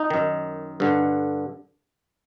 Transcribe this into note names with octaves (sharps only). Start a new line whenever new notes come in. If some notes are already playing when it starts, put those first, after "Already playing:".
Already playing: D#4
F#2 D#3
G2 D3